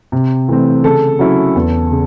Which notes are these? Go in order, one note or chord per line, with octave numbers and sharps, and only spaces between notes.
C3
E3 A3 C4
C#3 A4
F#3 C#4 E4
E2
C#3